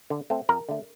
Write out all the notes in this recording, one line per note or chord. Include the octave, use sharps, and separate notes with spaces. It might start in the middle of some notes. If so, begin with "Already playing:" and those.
D3
A3 C4
F2 A#4 A#5
D3 A3